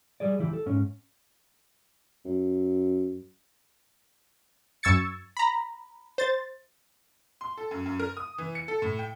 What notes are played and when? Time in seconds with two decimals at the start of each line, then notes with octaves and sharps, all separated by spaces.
0.20 G3 G#4 D5
0.38 C#2 E3 E4 G4
0.53 A4
0.66 G#2 C#4
2.25 F#2
4.83 F#2 C#6 E6 G#6 A6 C#7
5.37 A#5 B5
6.18 C5 A6
7.41 C6
7.57 A4
7.71 F#2
7.86 F#2
7.99 A#4
8.17 D#6
8.38 E3
8.55 C#7
8.68 A4
8.82 A2
8.99 G5